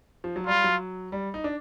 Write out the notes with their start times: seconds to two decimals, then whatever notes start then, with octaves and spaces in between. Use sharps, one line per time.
0.24 F3
0.36 F#3
0.47 G3 F4
0.64 F#3
1.12 G3
1.34 D#4
1.44 D4